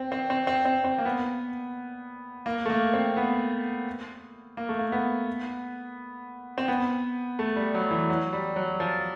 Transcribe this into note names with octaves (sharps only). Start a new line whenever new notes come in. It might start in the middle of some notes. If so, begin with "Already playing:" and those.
Already playing: C4
C4
C4
C4
C4
C4
A#3
B3
A#3
A3
A#3
C4
B3
A#3
A3
A#3
B3
C4
B3
A3
G3
F#3
E3
F#3
G3
F#3
F3